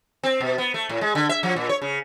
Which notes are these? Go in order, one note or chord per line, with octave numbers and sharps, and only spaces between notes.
C4
B2
B3
A3
A2
G#3
D3
E5
F3
A#2
C#5
C#3